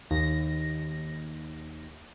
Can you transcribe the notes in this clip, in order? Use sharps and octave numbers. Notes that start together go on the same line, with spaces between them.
D#2 A#6